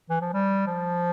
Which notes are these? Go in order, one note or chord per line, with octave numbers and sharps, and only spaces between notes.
E3
F3
G3
F3